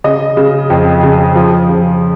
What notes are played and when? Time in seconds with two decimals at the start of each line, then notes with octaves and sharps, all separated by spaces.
0.04 C#3 D#5
0.37 C#3
0.70 F2
1.03 C#3
1.35 F3
1.69 C#3